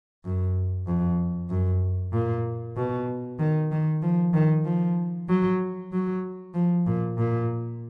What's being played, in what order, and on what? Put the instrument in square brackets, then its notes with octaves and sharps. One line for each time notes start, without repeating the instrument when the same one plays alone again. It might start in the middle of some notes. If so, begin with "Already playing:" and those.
[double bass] F#2
F2
F#2
A#2
B2
D#3
D#3
F3
D#3
F3
F#3
F#3
F3
A#2
A#2